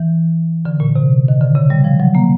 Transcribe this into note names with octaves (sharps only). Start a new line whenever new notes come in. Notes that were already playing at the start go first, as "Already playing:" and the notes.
Already playing: E3
D3
A#2
C3
D#3
D3
C#3
G3
F3
F#3
A#3